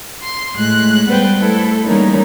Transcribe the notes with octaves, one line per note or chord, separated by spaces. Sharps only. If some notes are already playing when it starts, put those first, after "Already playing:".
C6
A2 G#3 F#6
G3 B3 B4 C5 G5
A3 E4 A4
E3 G3 G#3 A#3 C#4 D#4